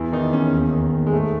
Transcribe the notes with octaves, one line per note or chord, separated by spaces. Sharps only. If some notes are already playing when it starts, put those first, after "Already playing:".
Already playing: E2 E3 E4
D#3 D#4
E2 C#4
D#2
D#3
D#2
G#3
G#2 A3